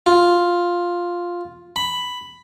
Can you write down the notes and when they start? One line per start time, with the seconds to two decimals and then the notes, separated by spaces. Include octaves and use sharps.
0.06 F4
1.76 B5